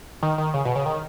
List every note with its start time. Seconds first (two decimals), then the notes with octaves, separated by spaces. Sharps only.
0.22 D#3
0.38 D#3
0.54 C#3
0.65 B2
0.75 C#3
0.86 D#3